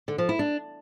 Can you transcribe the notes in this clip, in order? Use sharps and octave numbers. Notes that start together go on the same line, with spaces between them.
D3
F3
E4
D4